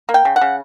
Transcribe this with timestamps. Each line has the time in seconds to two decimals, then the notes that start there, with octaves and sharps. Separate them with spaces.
0.09 A#3
0.14 G5
0.25 C#3
0.36 F#5
0.41 C#3